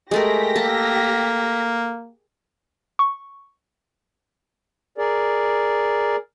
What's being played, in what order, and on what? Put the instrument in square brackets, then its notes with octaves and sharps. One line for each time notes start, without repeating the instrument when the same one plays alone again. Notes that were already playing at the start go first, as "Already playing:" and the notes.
[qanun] G#3 A3 A#4 [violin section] G4 A#6 B6
[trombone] A#3 [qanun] A4
[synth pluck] C#6
[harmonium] G#4 A#4 D5